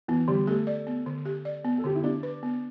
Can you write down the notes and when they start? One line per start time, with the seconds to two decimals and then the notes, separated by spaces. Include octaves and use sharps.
0.08 E3 B3
0.28 D3 G3
0.47 A3 G4
0.67 D5
0.87 B3
1.06 D3
1.25 G4
1.45 D5
1.65 B3
1.78 A4
1.84 D3 G4
1.95 E4
2.04 D4 G4
2.23 B4
2.43 B3